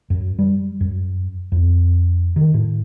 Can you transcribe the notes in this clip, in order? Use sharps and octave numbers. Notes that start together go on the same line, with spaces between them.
F#2
G3
F#2
F2
D#3
A2